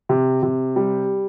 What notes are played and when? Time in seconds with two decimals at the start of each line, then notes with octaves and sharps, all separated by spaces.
0.09 C3
0.43 C3
0.76 G3